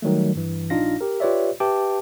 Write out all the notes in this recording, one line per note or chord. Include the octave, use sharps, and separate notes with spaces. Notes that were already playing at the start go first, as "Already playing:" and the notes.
D#3 F#3 G3 A3
G2 E3
A#1 D4 D#4 F4 F5 A#6
G4 A#4
F4 G4 B4 C#5 D5 E5
G4 B4 E5 G5 A5 D6